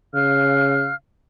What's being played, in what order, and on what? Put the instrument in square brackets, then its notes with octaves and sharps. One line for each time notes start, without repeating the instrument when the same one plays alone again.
[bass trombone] C#3 [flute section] F5 F6 F#6